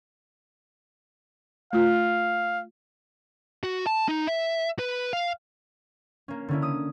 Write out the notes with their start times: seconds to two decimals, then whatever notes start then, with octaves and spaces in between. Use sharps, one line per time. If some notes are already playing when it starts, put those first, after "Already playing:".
1.73 A3 F4 F5
3.63 F#4
3.86 A5
4.09 D#4
4.27 E5
4.79 B4
5.13 F5
6.28 A#3 C#4
6.48 D3 C#4 E4
6.62 D#6